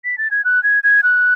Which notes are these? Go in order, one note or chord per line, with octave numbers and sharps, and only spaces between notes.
B6
A6
G#6
F#6
G#6
G#6
F#6